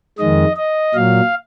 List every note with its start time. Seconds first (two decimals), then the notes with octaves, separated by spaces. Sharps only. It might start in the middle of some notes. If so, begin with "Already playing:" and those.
0.18 F2 D#3 G#3 D#5
0.56 D#5
0.94 A#2 F#3 F5